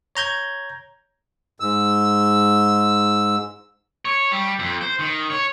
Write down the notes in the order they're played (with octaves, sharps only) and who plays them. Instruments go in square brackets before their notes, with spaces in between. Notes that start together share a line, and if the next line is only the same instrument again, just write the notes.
[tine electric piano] C#5 A#5 G6 G#6
[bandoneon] G#2 E6
[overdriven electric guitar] C#5
G3
F2
C5
D#3
C#5